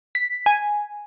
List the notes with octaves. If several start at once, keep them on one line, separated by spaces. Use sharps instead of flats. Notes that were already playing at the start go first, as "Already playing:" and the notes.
B6
G#5